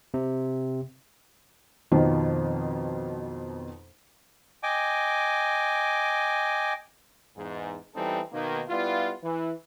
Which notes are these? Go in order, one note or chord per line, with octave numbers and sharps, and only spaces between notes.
C3
F2 B2 D#3 F3
D#5 G5 G#5 D6
E2 G#2
E2 E3 G3 C4 D#4 A4
B2 D#3 A#3
G3 B3 E4 F4
E3